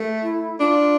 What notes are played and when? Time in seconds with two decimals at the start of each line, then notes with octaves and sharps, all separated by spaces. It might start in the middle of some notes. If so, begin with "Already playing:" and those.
Already playing: A3
0.22 E4
0.60 D4 F4